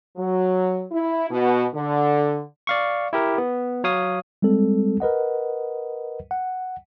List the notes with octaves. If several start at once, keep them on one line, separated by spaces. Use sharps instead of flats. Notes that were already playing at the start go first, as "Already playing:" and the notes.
F#3
E4
B2
D3
D5 F5 C#6
E4 G4 A#4
B3
F#3 C#5 F5 D#6
G3 G#3 C4 A4
A#4 B4 D#5 F#5
F#5